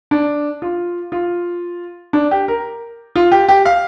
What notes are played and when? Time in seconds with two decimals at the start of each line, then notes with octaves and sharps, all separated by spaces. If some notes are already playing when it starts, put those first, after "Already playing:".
0.11 D4
0.62 F4
1.12 F4
2.13 D4
2.31 G4
2.48 A#4
3.16 F4
3.32 G4
3.48 G4
3.65 F5